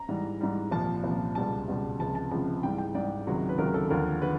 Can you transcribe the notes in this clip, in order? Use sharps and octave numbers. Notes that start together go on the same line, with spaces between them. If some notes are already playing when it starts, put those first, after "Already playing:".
Already playing: A#5
G#2 E3 G3
G#2 E3 G3
C2 A#2 F3 A5
C2 A#2 F3
C#2 B2 G3 A5
C#2 B2 G3
C#2 C3 F3 A5
A5
C#2 C3 F3 A5
G#2 E3 G3 G5
G5
G#2 E3 G3 D5
C#2 C3 D#3 F#3
B4
C#2 C3 D#3 F#3 A#4
A4
D#2 D3 F3 A#4
D3 B4